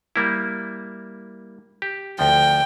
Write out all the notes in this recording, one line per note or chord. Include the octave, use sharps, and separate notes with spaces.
G3 A#3 E4
G4
D2 F3 G5